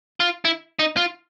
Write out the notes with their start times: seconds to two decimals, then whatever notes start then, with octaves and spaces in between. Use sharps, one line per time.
0.20 F4
0.45 E4
0.79 D#4
0.97 F4